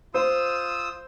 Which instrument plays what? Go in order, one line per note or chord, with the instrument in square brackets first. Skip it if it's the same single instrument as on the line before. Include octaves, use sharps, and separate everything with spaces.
[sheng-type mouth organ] F4 D#6 E6 [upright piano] C5